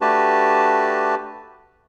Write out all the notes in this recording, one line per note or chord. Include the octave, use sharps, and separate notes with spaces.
A3 D4 F#4 G4 B4 A5